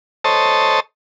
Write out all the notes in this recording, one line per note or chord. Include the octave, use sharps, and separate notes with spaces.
A4 C5 C#5 D#5 A5